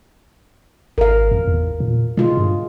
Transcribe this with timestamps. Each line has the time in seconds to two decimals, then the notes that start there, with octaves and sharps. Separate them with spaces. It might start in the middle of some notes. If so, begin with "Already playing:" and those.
0.98 G#1 A#4 F5
1.31 F2
1.47 E2
1.80 A#2
2.17 B2 G#3 F4
2.37 G2